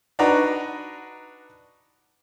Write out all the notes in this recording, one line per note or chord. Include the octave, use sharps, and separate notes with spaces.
D4 D#4 F#4 B4 A#5